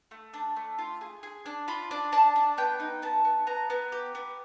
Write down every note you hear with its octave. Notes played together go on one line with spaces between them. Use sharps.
A3
D4
A3
F4
G#4
G#4
D4
F4 B5
D4
D4 A5
D4
B3 G5
D#4
B3 A5
B3
B3 A#5
B3
G4
B3